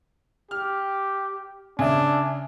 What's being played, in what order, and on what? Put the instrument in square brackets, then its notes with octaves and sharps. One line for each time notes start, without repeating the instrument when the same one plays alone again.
[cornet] G4 [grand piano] F6
[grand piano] C#3 [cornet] D4 [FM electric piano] E5 G#5